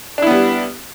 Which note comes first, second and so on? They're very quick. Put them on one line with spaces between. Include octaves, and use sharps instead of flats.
D4 E4 B3 G3